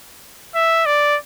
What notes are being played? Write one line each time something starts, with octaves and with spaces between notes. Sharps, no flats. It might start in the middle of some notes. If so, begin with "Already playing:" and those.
E5
D5